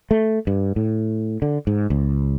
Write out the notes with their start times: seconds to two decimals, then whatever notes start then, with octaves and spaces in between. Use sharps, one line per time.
0.11 A3
0.47 G2
0.76 A2
1.42 D3
1.67 G#2
1.90 C#2